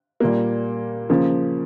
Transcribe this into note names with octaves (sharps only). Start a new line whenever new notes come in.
A#2 G3 A#3
C#3 F3 A#3